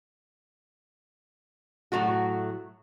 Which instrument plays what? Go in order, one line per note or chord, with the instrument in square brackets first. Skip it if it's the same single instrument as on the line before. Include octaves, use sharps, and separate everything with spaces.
[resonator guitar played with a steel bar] A2 F#3 A3 F#4